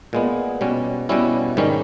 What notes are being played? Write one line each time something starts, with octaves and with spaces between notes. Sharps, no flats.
A#2 G#3 B3
B2 G3 C#4
B2 G3 C#4 E4
G#2 D#3 G3 C#4